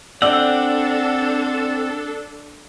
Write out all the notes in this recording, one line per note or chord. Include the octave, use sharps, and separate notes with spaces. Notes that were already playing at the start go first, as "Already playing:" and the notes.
C4 D4 A4 D5 F#5 E6